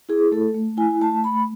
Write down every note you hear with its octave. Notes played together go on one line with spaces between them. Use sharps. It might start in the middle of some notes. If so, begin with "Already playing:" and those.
E4 G#4
A3 A4
A3
E4 G#5
A3 A5
A3 B5